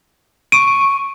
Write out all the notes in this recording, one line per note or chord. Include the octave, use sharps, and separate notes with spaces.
C#6 D7 D#7